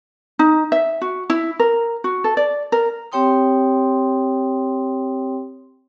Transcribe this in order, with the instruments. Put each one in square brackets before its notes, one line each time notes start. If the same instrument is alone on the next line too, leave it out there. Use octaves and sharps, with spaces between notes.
[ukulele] D#4
E5
F#4
E4
A#4
F#4
A4
D5
A#4
[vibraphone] C4 G4 C#5 G5 C6 D#6